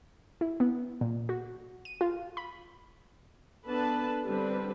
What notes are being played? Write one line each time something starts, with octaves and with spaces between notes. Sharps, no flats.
E4
B3
A#2
F#4
D#7
F4
B5
B3 D4 A4 B4 A5
D3 G3 C4 D4 B4